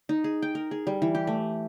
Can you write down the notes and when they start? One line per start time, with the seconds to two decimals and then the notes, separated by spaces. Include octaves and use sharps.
0.09 D#4
0.24 G#4
0.42 G5
0.55 A#4
0.71 G#4
0.87 G3
1.02 E3
1.15 G4
1.27 A3